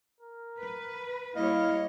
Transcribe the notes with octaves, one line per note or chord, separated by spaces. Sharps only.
A#4
B4
G3 A#3 E4 C#5 D#5 F5